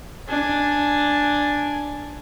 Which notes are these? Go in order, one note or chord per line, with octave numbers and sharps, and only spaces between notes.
D4 G#5